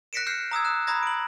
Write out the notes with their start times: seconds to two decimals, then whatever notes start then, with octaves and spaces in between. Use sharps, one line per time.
0.13 F#6 A#6 B6 C#7 D7 E7
0.27 F6 G6 C7 C#7
0.51 A#5 D#6 E6 G#6
0.65 F#6 E7
0.87 A#5 B5 D#6 G#6 A#6
1.03 D7 F#7